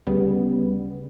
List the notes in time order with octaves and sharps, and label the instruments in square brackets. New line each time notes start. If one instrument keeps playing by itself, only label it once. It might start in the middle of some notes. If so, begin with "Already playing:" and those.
[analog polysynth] D2 C#3 G3 B3